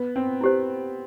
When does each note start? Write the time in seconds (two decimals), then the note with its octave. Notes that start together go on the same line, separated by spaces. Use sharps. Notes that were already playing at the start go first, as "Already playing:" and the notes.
Already playing: B3
0.16 C4
0.41 E4 G4 C5